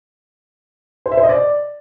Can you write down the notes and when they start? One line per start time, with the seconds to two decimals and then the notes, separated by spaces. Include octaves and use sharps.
1.06 C5
1.12 E5
1.17 C5
1.23 D#5
1.29 D5